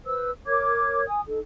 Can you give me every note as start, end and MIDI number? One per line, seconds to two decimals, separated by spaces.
0.05 0.30 71
0.05 0.30 72
0.05 0.30 88
0.46 1.05 70
0.46 1.05 73
0.46 1.05 86
0.46 1.05 92
1.07 1.20 80
1.07 1.20 87
1.27 1.39 63
1.27 1.39 69